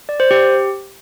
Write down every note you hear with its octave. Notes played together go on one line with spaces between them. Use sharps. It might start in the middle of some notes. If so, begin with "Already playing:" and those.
D5
C5
G4